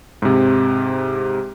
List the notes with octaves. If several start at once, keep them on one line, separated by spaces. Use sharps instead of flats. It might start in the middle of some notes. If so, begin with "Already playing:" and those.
G#2 C3